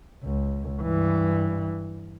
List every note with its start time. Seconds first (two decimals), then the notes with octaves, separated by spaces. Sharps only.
0.24 C#2
0.82 G2 E3